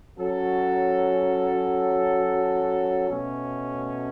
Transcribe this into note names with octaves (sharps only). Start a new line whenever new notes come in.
F#3 C#4 F#4 A4
B2 A3 C#4